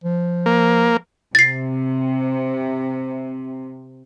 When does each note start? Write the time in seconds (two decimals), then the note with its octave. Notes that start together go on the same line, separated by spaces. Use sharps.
0.04 F3
0.46 A#3
1.35 C3 A6 C7